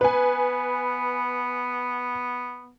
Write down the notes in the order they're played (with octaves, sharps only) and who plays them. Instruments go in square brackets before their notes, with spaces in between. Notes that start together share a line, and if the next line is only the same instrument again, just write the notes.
[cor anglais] B3 [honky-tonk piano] B4 G#5